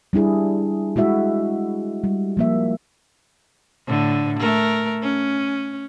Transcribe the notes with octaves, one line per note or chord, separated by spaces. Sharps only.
G3 D4 E4 G#4
G#3 E4 F#4 E5
G3
F3 A#3 E5
A2 D3
A3 A#4
C#4